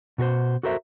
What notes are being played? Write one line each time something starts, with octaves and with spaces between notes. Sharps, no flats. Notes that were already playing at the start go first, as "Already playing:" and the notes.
B2 F#4 A#4 C5
F#4 A4 A#4 C5 E5